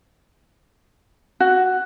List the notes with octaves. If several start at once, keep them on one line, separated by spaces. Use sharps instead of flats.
F#4